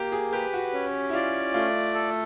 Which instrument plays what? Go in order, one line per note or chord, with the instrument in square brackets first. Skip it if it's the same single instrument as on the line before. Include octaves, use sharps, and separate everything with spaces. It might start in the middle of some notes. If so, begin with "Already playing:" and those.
Already playing: [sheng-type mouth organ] A#3 [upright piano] G4
[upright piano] G#4
[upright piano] G4 [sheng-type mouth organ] B4
[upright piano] F#4
[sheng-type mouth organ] C#4
[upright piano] E4
[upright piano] F4 [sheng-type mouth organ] D5
[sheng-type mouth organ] A3 [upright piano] F4
[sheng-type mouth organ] A4